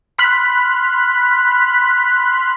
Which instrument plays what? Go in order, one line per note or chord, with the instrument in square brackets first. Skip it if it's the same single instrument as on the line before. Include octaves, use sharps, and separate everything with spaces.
[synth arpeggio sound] B5 C6 F6 F#6 B6